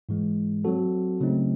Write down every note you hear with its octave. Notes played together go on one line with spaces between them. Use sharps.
G#2 E3 G#3
F#3 C4 F#4 A4
C#3 F#3 A3 C4 D#4